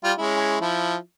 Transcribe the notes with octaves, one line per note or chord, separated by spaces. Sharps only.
G3 F4
G#3 C#4 E4
F3 E4